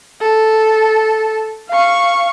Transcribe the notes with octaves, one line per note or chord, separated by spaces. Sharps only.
A4
F5 C#6